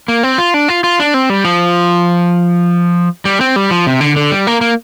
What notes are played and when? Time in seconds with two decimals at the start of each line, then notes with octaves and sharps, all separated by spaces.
0.08 A#3
0.23 C4
0.38 F4
0.54 D4
0.68 F4
0.84 F4
1.00 D4
1.14 C4
1.30 G3
1.45 F3
3.25 G3
3.40 C4
3.56 G3
3.70 F3
3.87 C3
4.01 D3
4.16 D3
4.31 G3
4.47 A#3
4.61 A#3